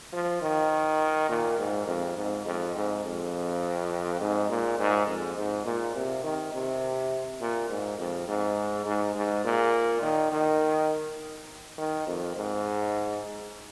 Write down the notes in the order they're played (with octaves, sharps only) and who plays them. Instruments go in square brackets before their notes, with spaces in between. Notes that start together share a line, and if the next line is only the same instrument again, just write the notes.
[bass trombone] F3
D#3
A#2
G#2
F2
G#2
F2
G#2
F2
G#2
A#2
G#2
F2
G#2
A#2
C3
D#3
C3
A#2
G#2
F2
G#2
G#2
G#2
A#2
D#3
D#3
D#3
F2
G#2